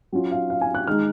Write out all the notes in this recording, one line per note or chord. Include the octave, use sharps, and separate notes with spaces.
F#3 C#4 F4
F5
F5
G#5
F#6
D#3 G#3 D#4 F6